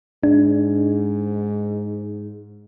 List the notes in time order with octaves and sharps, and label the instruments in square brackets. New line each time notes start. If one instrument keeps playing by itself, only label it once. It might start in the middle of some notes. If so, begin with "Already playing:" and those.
[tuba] G#2 [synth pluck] D4